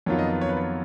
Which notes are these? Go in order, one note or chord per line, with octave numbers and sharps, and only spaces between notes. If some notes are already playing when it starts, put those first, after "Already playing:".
F2 D#3 F#3 B3 F4 C#5
D#5
B4
C#5
B4
C#5